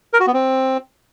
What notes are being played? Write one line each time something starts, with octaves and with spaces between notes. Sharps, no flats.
A#4
F#4
B3
C4